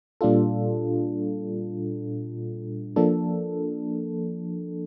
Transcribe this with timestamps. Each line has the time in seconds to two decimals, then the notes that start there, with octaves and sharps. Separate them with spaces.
0.21 A#2 G3 D4 F4 A4
2.96 F3 A#3 D4 A4